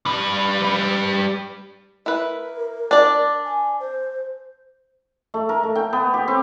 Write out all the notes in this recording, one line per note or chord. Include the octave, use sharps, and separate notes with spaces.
G3 B4
E4 A#4 B4
D4 D5
G#5
C5
A3
A#4
A3
G5
B3
G4
C4